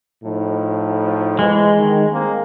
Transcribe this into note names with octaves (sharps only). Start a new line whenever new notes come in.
A2 F3 D#4
E2 E3 G#3
D#3
G#3 A#3 C4